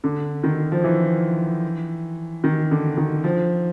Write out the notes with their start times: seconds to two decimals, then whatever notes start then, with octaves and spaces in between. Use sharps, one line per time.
0.04 D3
0.43 D#3
0.72 F3
0.84 E3
2.44 D#3
2.71 D3
2.97 D#3
3.24 F3